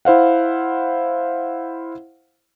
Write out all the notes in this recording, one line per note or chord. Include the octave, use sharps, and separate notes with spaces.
E4 C5 F5 F#5